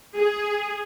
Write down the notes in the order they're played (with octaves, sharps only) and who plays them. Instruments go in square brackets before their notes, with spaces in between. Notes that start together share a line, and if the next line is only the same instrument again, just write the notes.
[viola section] G#4